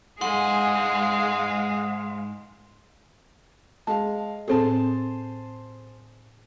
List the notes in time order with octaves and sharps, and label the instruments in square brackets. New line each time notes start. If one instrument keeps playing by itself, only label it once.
[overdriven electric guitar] G#2 C5 [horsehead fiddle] G#3 F5 [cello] G#4 [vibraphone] F#5
[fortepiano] G#3 F5 [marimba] A5
[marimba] A2 C4 A4 [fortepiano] G#4 C5 A5